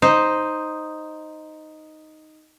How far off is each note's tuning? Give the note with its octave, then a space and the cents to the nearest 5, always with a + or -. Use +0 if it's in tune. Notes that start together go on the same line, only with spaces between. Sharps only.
D#4 +0 C5 +0 D#5 +0